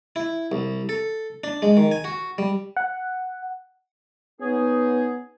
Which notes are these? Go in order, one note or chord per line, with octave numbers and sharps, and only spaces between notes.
E4
C2
A4
D4
G#3
D#3
G#5
F#4
G3
F#5
B3 C#4 D#4 G#4